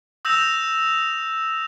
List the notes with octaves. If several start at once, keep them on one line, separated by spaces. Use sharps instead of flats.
D#6 E6 G6 A#6 E7 F7